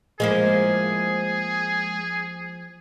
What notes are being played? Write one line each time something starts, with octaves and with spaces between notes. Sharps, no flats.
F3 G#3 A#3 E4 G#4